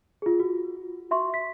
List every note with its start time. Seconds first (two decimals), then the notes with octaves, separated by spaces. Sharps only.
0.22 F4 G#4
0.40 F#4
1.11 F#4 E5 C6 C#6
1.34 B6